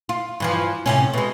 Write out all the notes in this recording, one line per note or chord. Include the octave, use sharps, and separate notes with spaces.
F4
G2 E3 F3
A2 C3 C#4
B2 G#3